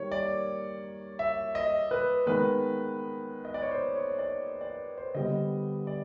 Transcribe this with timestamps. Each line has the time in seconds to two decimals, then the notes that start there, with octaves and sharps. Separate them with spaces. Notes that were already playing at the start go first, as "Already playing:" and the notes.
Already playing: D#3 G3 A#3 C#5
0.12 D5
1.19 E5
1.55 D#5
1.91 B4
2.26 D#3 G#3 B3 B4
3.45 D#5
3.54 D5
3.62 C#5
3.71 C5
3.95 C#5
4.19 D5
4.61 D5
4.98 C5
5.14 D3 G3 B3 D#5
5.87 D5